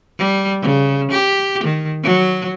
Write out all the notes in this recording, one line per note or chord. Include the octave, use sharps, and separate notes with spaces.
G3
C#3
G4
D#3
F#3